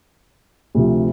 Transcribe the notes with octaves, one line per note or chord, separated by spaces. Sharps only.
D2 C3 F3